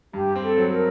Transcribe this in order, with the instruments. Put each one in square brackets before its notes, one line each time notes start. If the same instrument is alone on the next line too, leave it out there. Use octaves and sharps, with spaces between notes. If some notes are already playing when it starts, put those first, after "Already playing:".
[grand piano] G2 [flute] G4
[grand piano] C4
[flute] A4
[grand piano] F#3
[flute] A#4